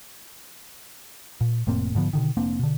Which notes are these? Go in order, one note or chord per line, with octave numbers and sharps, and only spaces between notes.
A#2
F1 A2 A#3 C4
G#2 D3 F3 B3
B2 D3 D#3
F1 A#3 C4 D4
B2 D3